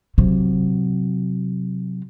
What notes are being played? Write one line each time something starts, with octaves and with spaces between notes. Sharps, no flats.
C3 F#3